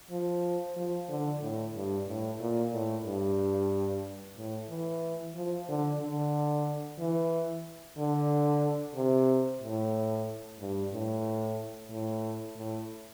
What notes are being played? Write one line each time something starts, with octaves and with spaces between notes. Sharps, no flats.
F3
F3
D3
A2
G2
A2
A#2
A2
G2
A2
E3
F3
D3
D3
E3
D3
C3
A2
G2
A2
A2
A2